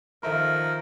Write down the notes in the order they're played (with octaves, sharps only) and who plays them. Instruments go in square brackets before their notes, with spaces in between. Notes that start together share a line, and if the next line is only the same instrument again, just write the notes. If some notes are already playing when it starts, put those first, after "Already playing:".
[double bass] D#3 [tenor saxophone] F3 [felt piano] A4 E5 A#5 [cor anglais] A#4